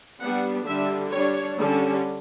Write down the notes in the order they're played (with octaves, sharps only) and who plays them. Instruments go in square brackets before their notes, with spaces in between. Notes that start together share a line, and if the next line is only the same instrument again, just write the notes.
[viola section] G3 B3 D4 F#5
D3 G3 D4 E5
G3 D4 C#5
D3 G3 C#4